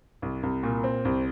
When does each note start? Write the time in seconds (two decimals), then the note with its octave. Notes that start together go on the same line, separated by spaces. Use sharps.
0.22 C2
0.43 C2
0.63 A#2
0.84 C4
1.05 C2